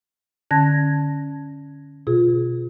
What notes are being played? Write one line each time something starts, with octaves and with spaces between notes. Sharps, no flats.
D3 C#4 A5 G#6 A#6
B2 F4 G#4